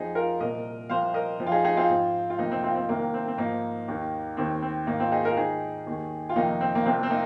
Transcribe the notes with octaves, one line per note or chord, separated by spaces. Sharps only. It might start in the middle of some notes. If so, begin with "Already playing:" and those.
Already playing: F2 F3 D#4 G#4
F4 A#4
C2 A#2 F3 A#4 D#5
C2 C3 F3 C5 F5
A#4 D#5
F2 F3
F4
D#4 G#4
D#4 G#4
C4 F4
G#2 F3
F4
F2 C3 F3 A#3 D#4
C4
C4 F4
C4
C2 C3 D#3 A#3
C4
C4
G#2 F3 A#3 D#4
D#2 D#3
D#2 D#3 C4
C4
G#2 D#3 A#3 D#4
C4 F4
D#4 G#4
F4 A#4
G#2 D#3 D#4 G#4
D#2 D#3
F4
F2 C3 D#3 A#3 D#4
C4
A#3
C2 C3 F3 C4
C4
A#3 D#4